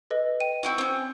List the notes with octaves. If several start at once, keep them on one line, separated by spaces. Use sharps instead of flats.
A4 B4 D#5
G5 D#7
C4 E4 F#4
C4 C#4